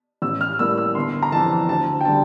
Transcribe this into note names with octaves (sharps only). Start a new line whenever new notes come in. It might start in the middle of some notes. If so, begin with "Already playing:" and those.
A1 E6
F6
A2 G3 A#3 E6
E6
G1 C6
A#5
F2 E3 A5
D2 A5
G5
D3 G3 A5